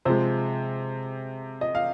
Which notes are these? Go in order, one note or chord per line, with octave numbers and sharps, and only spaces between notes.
C3 F3 G#3 C5
D#5
F5